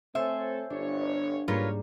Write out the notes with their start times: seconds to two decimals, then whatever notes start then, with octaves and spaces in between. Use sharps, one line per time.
0.15 A3 C4 A4 C5 C#5 E5 G#5
0.70 G1 D4 C#5
1.48 G#2 G3 A#3 F4 G4 A#4 B4 C#5